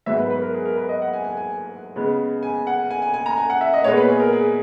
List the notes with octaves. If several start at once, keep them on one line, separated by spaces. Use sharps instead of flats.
G#2 F#3 B3 E5
B4
B4
A#4
G#4
A#4
B4
D#5
F#5
G#5
G#5
G#5
C#3 G#3 B3
G#5
F#5
G#5
G#5
G#5
A#5
G#5
F#5
E5
D#5
A#2 G#3 B3 C#5
B4
G#4
A#4
G#4